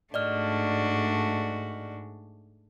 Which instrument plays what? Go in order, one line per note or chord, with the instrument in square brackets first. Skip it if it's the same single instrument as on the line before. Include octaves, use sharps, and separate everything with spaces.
[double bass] G#2 [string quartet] A3 D4 F#4 [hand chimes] D5 D#5 F6